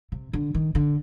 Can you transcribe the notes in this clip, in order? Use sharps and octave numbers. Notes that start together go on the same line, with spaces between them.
C3
D3
D#3
D3